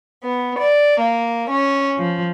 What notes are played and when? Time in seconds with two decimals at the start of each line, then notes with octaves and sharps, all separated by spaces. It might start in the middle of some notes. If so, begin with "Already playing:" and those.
0.22 B3
0.57 D5
0.98 A#3
1.49 C#4
1.99 F3